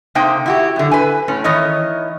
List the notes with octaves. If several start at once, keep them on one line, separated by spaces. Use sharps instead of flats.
C3 A#3 D#4 C5 G5
E4 F#4 G4
F#2 D3
B4 G#5
A2 C#4
D#3 E3 C#5 D#5